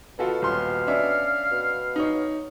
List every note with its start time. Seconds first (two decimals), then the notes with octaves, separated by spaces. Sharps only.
0.19 B2 F4 F#4 A4
0.42 D#1 F5 C6
0.87 C#4 D4 E5
1.51 B2
1.96 D#4 C#5